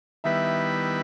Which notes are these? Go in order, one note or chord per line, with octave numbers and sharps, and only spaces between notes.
D#3 G3 B3 E4 B4 E5